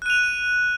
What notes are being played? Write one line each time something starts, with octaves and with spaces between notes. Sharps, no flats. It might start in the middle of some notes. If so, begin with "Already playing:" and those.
F#6 D#7 F7